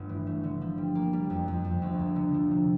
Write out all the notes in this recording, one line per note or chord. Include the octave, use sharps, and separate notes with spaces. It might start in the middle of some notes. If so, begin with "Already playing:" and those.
Already playing: G1 A3
E3
A3
D3
F3
G3
A#3
G3
F2
F2
F2
D2
A#3
D3
F3
C3